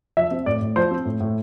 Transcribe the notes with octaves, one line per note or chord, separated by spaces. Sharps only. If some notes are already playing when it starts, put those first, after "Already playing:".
F3 E5
C4
A2 D5
A2
F3 C5
C4
A2
A2